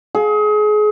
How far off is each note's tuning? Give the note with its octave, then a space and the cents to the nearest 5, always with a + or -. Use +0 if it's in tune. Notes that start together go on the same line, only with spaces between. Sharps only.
G#4 +30